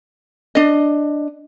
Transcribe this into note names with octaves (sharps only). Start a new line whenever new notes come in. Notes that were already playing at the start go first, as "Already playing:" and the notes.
D4 D#5